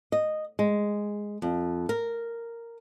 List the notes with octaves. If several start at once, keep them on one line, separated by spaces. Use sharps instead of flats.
D#5
G#3
F2
A#4